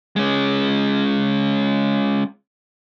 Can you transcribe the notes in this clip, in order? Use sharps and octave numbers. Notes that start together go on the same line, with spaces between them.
G#3 C#4